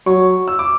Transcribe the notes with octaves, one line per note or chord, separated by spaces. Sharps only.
F#3 C#6
E6
D6